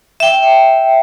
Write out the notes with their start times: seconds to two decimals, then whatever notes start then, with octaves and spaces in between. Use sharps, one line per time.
0.20 E5 G5